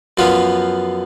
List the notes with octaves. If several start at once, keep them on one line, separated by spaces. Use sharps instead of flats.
F#2 F3 B3 F4